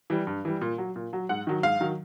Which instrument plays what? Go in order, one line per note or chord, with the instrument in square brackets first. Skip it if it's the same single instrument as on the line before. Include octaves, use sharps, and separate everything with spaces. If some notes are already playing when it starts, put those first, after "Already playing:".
[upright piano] E3 G3
G2
E3 G3
A#2
F#3
A#2
F#3
G#2 F#5
D#3 F#3
G#2 F5
D#3 F#3